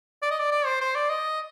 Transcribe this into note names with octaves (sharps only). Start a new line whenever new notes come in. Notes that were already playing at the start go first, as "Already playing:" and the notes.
D5
D#5
D5
D5
C5
C5
D5
D#5